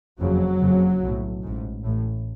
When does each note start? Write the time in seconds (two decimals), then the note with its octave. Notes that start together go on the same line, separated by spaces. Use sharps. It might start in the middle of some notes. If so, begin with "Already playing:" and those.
0.19 F#1 F2 C#3 F#3
0.60 F#1 F2 C#3
1.01 B1 A2
1.43 A1 G#2
1.83 A1 A2